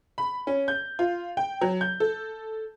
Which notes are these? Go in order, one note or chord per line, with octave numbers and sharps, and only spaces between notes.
B5
C#4
G6
F4
G5
F#3
G6
A4